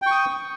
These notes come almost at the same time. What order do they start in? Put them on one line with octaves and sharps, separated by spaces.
G5 C#6 D#6